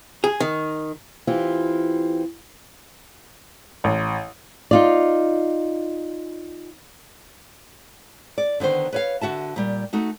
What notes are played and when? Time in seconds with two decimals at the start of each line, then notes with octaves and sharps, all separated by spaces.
0.24 G#4
0.40 D#3
1.27 E3 C4 F4 G4
3.84 A1
4.71 D#4 F4 D5
8.38 D5
8.60 D3 D#3 B3 C5
8.93 B4 C#5 F5
9.21 D3 F#4 E5 A5
9.56 A#2 G3
9.93 A3 D#4 F#4